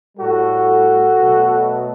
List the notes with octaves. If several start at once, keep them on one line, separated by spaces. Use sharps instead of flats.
A2 G3 F#4 A4
B2 F#3 A3